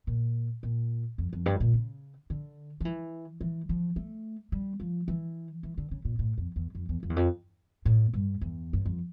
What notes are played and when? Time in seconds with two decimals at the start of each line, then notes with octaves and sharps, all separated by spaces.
0.07 A#2
0.63 A#2
1.18 F2
1.33 F2
1.46 G2
1.60 A#2
1.74 C#3
2.30 D3
2.80 F3
2.85 E3
3.41 E3
3.69 F3
3.96 A3
4.52 G3
4.80 F3
5.08 E3
5.63 E3
5.78 D3
5.91 C#3
6.05 A#2
6.19 A2
6.38 F2
6.56 E2
6.75 F2
6.89 E2
7.03 F2
7.10 E2
7.16 F2
7.85 A2
8.13 G2
8.41 E2
8.73 G2
8.85 F2